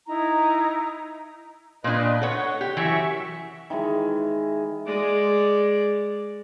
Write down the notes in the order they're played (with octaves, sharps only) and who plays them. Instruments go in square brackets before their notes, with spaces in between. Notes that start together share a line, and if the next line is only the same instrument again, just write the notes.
[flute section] D#4 E4 A#5
[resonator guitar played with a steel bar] A#2 D4 [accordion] B4 D#5
[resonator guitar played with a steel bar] A4 C#5 [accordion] F#5
[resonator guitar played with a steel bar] G4
[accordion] F#2 E5 C#6 [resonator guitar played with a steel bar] E3
[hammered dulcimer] D#3 E3 G#3
[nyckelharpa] G#3 D5